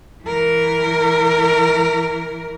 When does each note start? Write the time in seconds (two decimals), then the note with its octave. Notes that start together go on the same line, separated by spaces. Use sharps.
0.23 E3 A#4